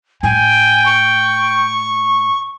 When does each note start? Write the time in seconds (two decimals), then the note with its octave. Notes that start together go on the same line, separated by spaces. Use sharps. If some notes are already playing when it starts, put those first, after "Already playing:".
0.23 A2 G5 G#5
0.86 C#6